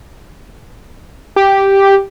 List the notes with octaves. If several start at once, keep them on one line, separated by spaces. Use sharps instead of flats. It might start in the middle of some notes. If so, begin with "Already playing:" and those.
G4